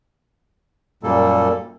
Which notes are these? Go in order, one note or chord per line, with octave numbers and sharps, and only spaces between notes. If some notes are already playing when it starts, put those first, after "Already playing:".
F#2 A#2 G3 A#3 A4